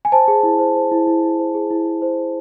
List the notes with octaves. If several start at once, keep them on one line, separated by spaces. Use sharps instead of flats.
G#5
C5 A5
G#4
E4
C5
C5
E4
E4
E4
C5
G#4
E4
E4
C5
G#4